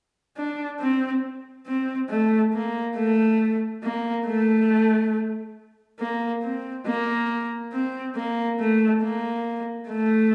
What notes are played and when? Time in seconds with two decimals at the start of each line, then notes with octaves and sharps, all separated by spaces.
0.37 D4
0.80 C4
1.67 C4
2.10 A3
2.54 A#3
2.97 A3
3.84 A#3
4.26 A3
5.99 A#3
6.43 C4
6.86 A#3
7.73 C4
8.16 A#3
8.60 A3
9.02 A#3
9.89 A3